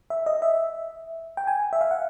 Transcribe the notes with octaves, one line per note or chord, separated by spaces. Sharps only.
E5
D#5
E5
G5
G#5
E5
F5
F#5